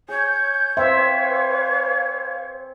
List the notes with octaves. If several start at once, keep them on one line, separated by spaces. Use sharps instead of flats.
G#4 C#5 G6
C4 B4 C5 E5 F5